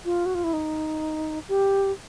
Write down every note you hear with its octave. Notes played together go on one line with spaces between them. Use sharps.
F4
F#4
F4
E4
D#4
G4